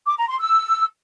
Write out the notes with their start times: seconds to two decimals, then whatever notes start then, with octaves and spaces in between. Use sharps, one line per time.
0.06 D6
0.18 A#5
0.29 C6
0.40 E6